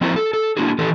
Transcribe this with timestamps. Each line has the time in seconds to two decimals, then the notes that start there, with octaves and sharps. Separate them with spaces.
0.01 F3 C4 E4 G#4 A#4 C5
0.16 A4
0.33 A4
0.57 A#3 D4 E4 F#4 G#4
0.78 D#3 E3 C#4 G4 A4 B4